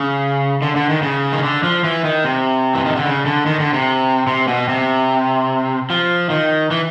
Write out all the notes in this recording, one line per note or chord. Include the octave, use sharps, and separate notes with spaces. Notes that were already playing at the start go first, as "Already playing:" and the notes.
Already playing: C#3
D3
D3
D#3
C#3
D#3
D3
F3
E3
D#3
C3
E3
D#3
D3
C#3
D3
D#3
D3
C3
C3
B2
C3
F3
D#3
E3